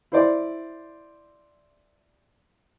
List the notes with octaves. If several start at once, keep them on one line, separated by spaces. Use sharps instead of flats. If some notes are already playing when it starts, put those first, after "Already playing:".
E4 C5 D5